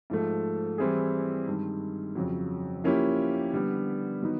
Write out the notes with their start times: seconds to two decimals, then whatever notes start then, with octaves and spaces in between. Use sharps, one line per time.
0.10 G#2 F3 A3
0.78 E3 G3 C4 E4 G#4
1.47 G2 D#3 G#3
2.15 F2 C#3 F#3
2.84 F3 A#3 C#4 E4 G4
3.53 D3 G3 B3
4.22 D#3 F#3 B3 D#4